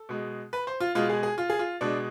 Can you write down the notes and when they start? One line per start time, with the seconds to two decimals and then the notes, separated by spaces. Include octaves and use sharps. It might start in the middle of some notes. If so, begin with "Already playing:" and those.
Already playing: A4
0.09 B2 G#3
0.53 B4
0.67 C5
0.80 F4
0.95 B2 G#3 F4
1.10 G#4
1.23 G#4
1.38 F4
1.50 G#4
1.59 F4
1.81 B2 G#3 D4